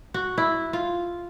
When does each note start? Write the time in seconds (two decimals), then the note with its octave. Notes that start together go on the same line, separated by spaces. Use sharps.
0.14 F#4
0.38 E4
0.73 F4